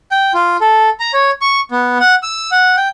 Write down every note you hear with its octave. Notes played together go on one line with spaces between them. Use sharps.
G5
F4
A4
A#5
C#5
C#6
B3
F#5
E6
F#5
G5